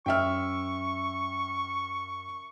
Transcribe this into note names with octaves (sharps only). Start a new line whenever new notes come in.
F#2 E5 G5 C#6 F6